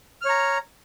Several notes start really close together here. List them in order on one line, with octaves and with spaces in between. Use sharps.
F6 C#5 A#5